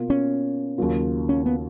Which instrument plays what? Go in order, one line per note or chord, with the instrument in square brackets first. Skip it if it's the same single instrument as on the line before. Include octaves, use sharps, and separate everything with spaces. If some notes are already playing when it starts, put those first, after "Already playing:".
Already playing: [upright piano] B2 A#3 F4
[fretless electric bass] C#4
[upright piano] D#2 C#3 F#3 A#3 F4
[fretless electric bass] C#4
B3